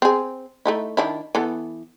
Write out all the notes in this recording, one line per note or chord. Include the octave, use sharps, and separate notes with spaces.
C4 G#4
A3 D#4 E4
D#3 D4 E4
E3 B3 A4